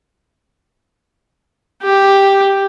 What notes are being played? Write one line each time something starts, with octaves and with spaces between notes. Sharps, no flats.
G4